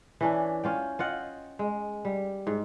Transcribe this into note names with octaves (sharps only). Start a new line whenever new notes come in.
E3 C#4 D4
C#4 F4 G5
F4 D#5 F#5 G5
G#3
G3
G#2